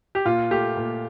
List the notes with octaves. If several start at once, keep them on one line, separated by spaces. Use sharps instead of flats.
G4
A#2 F4
A3 G4
A#2